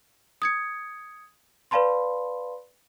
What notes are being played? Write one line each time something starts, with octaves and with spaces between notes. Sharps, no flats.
D#6 G#6 C#7
B4 D5 F5 A5 B5 C6